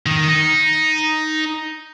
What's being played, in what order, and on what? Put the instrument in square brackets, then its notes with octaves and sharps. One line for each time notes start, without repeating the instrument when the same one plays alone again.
[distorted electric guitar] D#3
D#4